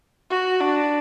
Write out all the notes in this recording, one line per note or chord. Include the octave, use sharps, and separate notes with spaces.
F#4
D4